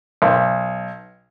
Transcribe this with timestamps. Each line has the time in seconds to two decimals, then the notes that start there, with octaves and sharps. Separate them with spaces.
0.22 B1